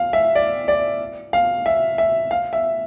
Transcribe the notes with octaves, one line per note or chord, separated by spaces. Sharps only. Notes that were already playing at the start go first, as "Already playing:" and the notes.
Already playing: F5
E5
D5
D5
F5
E5
E5
F5
E5